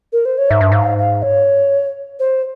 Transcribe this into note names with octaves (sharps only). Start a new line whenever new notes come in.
A#4
C5
C#5
G#2 E5
G2
G#2 F5
F5
C#5
C5